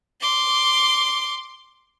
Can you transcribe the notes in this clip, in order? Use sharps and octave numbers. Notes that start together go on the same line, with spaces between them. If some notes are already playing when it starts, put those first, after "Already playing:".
C6 D6